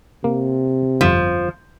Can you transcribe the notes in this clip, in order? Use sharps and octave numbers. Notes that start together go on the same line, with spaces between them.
C3 A#3
G1 F2 F3